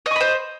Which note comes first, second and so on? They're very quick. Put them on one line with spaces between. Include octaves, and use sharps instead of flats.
D#5 C#6 B5 C5